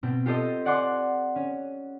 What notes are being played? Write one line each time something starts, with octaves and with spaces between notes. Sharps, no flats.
B2 C4
F4 G4 A4 C5 D#5
D5 F#5 G#5 C6 D6
C#4